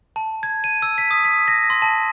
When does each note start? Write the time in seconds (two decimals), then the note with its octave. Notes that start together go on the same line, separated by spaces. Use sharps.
0.16 A5
0.43 G#6
0.64 D#7
0.82 E6
0.98 B6
1.11 D#6
1.25 B6
1.48 A#6
1.70 C6
1.82 A5